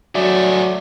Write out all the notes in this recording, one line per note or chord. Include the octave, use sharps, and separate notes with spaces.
F#3 A3 G#4 D5